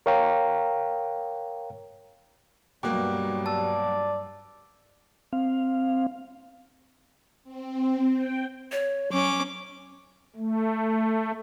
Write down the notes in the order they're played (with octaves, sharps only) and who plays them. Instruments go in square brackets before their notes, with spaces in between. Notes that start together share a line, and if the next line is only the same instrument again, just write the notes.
[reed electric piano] A#4 C#5 F5 G5 A#5
[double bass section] G2 F#3 G3 [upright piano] B2 A#3 [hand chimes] G5 D6 F#6
[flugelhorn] D5 [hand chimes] A5 E6
[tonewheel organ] C4 F5
[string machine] C4
G5
[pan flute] C#5
[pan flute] F#3 [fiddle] C#4 D6
[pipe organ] A3